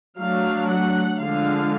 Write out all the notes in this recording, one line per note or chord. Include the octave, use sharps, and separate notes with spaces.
F#3 A3 D4 F5
F#5
D3 F3 G#3 F5